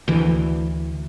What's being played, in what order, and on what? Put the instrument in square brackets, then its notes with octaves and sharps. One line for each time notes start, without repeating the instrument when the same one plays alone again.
[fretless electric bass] D2 E3